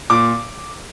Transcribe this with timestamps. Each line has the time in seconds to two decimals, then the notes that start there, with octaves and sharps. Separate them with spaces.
0.10 A#2 D6